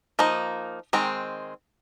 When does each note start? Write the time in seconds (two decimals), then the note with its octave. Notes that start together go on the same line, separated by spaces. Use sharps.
0.19 F3 A#3 D#4
0.93 D#3 G#3 C4